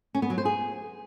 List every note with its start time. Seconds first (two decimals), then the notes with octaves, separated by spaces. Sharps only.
0.15 C#4
0.22 B3
0.30 F#3
0.38 C5
0.45 G#4